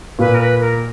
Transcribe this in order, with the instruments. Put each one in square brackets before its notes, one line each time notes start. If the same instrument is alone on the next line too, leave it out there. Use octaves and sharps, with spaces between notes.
[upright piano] A#2 [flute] B4
[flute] A#4
B4
A#4